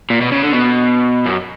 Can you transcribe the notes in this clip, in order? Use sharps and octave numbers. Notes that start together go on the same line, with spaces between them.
A#2
B2
C#3
D3
B2
F#2